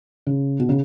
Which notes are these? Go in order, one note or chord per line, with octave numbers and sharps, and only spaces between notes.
C#3
B2
C#3